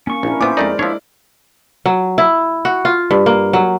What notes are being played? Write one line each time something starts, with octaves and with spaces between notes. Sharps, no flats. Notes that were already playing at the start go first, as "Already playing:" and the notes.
A#3 C#4 C#6
A#1 D4 E4 A#4
A#2 B3 E4 C5 E5 D6
F2 G#3 A3 D#4 A#4 D5
F3 D4 E4 C#5 E5
F#3
E4
F#4
F4
G2
A#3
F#3